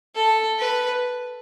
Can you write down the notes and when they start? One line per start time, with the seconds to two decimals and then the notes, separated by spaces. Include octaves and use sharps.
0.15 A4
0.58 B4